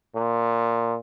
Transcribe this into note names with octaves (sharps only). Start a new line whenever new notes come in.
A#2